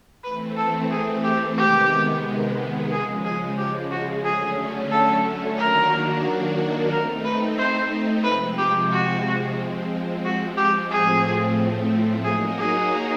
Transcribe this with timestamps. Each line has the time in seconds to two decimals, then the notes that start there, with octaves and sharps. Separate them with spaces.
0.24 E3 A3 C4 B4
0.57 A4
0.91 G#4
1.24 G4
1.57 C3 D#3 G#3 B3 G4
2.91 C#3 F3 G#3 G#4
3.25 G#4
3.58 G4
3.92 F#4
4.24 D3 F#3 A3 C#4 G#4
4.92 A4
5.58 D#3 F#3 A#3 D4 F#4 A#4
6.91 A3 C4 D#4 A#4
7.25 B4
7.58 C5
8.24 C3 F3 G#3 C4 B4
8.58 G4
8.92 F#4
9.58 F3 G#3 C4
10.25 F#4
10.57 G4
10.91 A2 F3 A3 C4 G#4
12.25 F#3 A#3 D#4 F#4 G#4 A#4
12.58 G#4